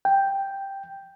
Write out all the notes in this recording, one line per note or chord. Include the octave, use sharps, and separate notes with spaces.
G5